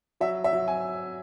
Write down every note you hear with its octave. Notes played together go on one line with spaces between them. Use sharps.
F#3 E5
E5
F#3
G#5